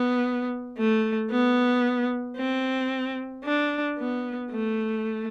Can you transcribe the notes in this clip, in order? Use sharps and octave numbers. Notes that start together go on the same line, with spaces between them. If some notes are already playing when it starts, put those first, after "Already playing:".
Already playing: B3
A3
B3
C4
D4
B3
A3